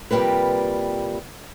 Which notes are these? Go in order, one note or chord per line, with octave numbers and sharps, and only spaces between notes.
C3 F3 G3 G#3 A#3 B4